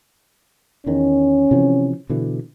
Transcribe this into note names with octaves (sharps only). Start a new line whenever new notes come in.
E2 D#3 C#4
C3 E3 F3
B2 D3 E3